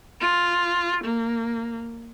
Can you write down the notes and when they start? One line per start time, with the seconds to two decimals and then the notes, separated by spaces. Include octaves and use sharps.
0.21 F4
1.04 A#3